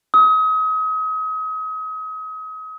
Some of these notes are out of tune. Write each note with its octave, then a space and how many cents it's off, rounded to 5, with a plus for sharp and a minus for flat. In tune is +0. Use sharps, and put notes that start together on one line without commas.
D#6 +35